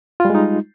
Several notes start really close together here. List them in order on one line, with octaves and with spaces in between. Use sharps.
F4 G3 G#3 D#4